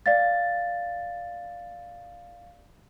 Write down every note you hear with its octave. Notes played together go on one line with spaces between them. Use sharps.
D5 F5 A6